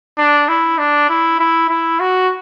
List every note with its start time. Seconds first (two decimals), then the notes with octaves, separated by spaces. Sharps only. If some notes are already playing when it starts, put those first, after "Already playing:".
0.18 D4
0.48 E4
0.78 D4
1.09 E4
1.39 E4
1.69 E4
2.00 F#4